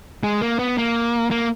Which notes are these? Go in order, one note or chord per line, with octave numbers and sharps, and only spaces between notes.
G#3
A#3
B3
A#3
A#3